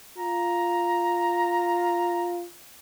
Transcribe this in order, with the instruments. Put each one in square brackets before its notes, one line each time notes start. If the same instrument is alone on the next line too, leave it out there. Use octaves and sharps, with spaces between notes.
[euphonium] F4 [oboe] A#5